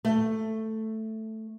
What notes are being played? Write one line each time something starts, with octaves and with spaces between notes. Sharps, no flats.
A3